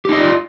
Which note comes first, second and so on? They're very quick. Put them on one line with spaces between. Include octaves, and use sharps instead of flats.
G4 D#4 D#5 D5 F4